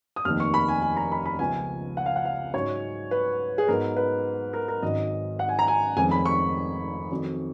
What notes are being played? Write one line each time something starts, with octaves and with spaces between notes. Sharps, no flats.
D#6
F1 D#2 D#3 F6
C#6
B5
G#5
G#5
A#5
B5
B5
C#2 C#3 F3 B3 G#5
F#5
F5
F#5
F5
G#2 F#3 C#4 C#5
B4
G#4
G#2 F#3 B3 A#4
B4
A#4
A#4
G#1 G#2 D#3 F#3 C#4 D#5
F#5
G#5
A#5
G#5
F1 F2 D#3 G#3 C#4 G#5
B5
C#6
F2 D#3 F#3